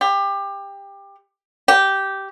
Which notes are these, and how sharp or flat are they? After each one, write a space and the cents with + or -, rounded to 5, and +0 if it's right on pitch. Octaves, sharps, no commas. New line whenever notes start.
G4 +20
G4 -10